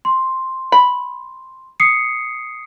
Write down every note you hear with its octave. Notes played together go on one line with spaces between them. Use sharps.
C6
B5
D#6 C7 C#7